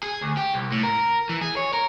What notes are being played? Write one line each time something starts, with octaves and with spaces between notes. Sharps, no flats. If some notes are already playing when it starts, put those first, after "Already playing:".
G#4
D2
G4
C2
A2
A#4
E3
G#4
C#5
A#4